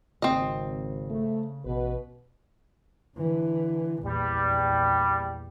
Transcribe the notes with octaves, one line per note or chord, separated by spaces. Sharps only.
G#1 C#3 C4 D#5
A3
A1 B2 B4
D3 E3
A#1 E2 G3